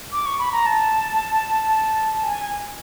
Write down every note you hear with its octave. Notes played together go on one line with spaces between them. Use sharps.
D6
C#6
B5
A#5
A5
G#5